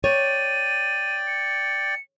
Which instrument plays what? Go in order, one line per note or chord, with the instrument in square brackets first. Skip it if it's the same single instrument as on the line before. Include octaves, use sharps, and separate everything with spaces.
[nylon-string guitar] C#5 [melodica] D5 G5 [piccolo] D#7
[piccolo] C#7